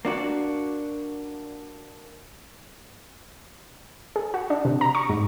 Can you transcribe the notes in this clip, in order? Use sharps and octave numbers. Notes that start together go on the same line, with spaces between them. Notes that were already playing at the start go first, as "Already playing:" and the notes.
A#3 D4 F#4
G#4
F#4
D4
C3
A#5
C#6
G#2